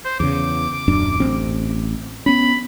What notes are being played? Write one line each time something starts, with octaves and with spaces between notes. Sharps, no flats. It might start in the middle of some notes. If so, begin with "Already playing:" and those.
C5
E2 C#3 D6
D#1 F#2 D4
A1 C4
B3 C#4 B5